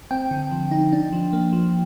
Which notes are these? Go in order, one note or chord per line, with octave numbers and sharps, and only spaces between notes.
C4 G5
D3
F3
D#4
D4
F3
A#3
F3